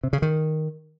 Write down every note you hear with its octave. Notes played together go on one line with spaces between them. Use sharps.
C3
C#3
D#3